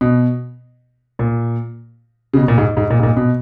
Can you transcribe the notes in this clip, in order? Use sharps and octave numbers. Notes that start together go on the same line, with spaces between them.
B2
A#2
C#3
B2
A#2
G#2
G#2
A#2
G#2
A#2
B2